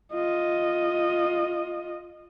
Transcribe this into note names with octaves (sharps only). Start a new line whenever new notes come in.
F4 D#5